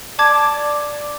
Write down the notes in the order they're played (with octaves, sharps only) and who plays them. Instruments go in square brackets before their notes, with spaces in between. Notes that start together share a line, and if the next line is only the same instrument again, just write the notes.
[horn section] D5 [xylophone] A5 D6 G#6